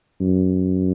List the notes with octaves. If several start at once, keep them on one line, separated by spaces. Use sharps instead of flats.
F#2